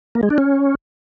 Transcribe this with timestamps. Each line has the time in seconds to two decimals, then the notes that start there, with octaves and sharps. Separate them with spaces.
0.15 A#3
0.23 G#3
0.30 D4
0.38 C#4